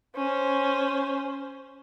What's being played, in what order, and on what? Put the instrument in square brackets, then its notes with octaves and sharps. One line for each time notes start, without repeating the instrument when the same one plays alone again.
[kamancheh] C#4 C5